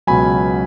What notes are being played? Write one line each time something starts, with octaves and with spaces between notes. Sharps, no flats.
C#2 B2 F#3 G#5 B5